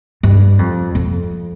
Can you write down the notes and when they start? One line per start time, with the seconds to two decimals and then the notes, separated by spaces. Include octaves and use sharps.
0.23 G2
0.59 F2
0.95 F2